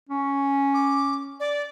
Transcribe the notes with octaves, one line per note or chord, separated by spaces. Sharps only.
C#4
D6
D5